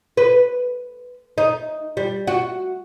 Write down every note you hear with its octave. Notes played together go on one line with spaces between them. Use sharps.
B4
D#4
G3
F#4